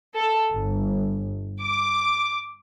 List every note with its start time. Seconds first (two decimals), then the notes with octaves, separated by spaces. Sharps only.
0.15 A4
0.53 G1
1.61 D6